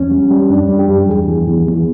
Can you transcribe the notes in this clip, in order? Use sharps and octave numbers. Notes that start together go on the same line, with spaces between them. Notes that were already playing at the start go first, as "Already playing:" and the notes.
Already playing: E2 C#4
G3
G3
F#2 D4
G3
G4
F#2
E2 G#4
E2
E2
E2